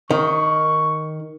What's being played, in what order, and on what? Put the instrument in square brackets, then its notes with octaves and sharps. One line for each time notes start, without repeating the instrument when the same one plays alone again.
[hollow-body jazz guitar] D#3 [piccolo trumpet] C#6